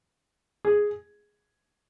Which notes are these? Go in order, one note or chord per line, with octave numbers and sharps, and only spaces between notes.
G#4